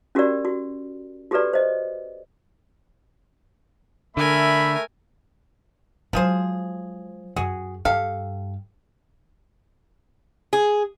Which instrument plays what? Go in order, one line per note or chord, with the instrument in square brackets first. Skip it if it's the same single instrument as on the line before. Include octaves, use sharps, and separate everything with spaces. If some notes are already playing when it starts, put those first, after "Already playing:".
[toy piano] C#4 F#4 G4 A#4 D5
F#4
F#4 G4 A4 B4 D5
C5 D#5
[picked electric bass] D3 [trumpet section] A3 E5 [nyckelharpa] A#4 G#5 [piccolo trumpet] B5
[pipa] F3 G#4 C5 [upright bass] F#3 G#3
[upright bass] F#2 [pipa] F#4 G#4
[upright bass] G2 [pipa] G4 A4 F5
[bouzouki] G#4